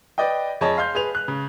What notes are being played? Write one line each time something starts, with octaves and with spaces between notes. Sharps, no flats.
B4 D5 D#5 G5
F2 G#4 C#5 D#5 A5
F5 C6 G6
G#4 B4 F7
F#6
C#3